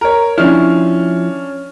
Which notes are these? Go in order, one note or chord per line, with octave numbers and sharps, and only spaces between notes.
A#4 C#5
F3 C#4 D4 E4 F6